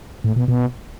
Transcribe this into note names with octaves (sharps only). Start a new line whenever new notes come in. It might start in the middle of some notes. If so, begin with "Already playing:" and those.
A2
B2
B2